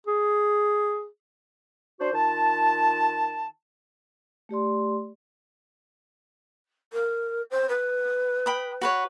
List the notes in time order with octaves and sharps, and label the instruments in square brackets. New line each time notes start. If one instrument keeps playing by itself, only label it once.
[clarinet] G#4
[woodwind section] D4 F#4 C5
D#3 F4 A5
[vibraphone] A3 G4 D5 C6
[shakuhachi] A#4
C5
B4
[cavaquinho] G5 B5 D#6
F#4 B4 C#5